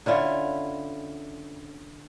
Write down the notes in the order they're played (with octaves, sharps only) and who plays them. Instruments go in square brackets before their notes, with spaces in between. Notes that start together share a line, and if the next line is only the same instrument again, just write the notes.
[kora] D3 C#4 E4 F4